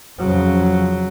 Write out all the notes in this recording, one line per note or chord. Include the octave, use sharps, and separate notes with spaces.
F2 C#3 F3 F#3